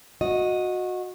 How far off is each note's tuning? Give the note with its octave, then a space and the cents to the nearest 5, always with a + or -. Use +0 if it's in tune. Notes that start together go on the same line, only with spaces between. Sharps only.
F#4 -20 D#5 +0